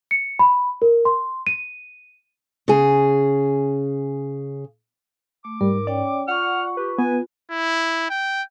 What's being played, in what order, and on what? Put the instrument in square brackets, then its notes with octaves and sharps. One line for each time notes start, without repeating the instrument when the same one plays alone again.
[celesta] C#7
B5
A#4
C6
D#7
[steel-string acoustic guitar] C#3 G#4
[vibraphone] A3 [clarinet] D6
[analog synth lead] G#2 [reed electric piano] G3 [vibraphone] A#4
[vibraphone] C#4 C#5 G5 [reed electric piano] D5
[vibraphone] F4 C#6 [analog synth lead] F#5 [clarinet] F6
[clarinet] G4 [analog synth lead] B4
[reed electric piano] B3 [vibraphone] F4 [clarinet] G#5
[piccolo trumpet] E4
G5